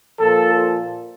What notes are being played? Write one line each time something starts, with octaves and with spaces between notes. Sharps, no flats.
A#2 F3 A4